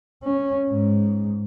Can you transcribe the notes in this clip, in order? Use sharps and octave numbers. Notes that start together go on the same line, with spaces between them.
C#4
G#2